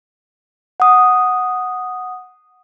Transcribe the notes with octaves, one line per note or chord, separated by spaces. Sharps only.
F#5 D#6